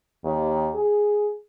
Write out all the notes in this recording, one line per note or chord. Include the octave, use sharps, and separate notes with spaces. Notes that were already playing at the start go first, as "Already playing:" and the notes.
D#2
G#4